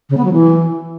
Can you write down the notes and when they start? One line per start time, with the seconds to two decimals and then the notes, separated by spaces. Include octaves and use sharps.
0.10 C#3
0.17 B3
0.25 F#3
0.32 E3